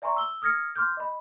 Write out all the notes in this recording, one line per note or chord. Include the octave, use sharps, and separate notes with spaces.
D5 E5 G#5 A#5 C6 C#6
E6 G7
D#6 F6 G#6 A#6 C#7
C6 D6 F6 G6
D#5 B5